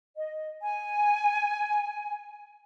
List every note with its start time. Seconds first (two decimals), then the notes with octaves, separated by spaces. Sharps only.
0.16 D#5
0.62 G#5